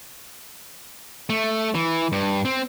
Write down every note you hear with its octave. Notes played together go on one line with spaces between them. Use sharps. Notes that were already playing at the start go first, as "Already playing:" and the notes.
A3
E3
G2
C4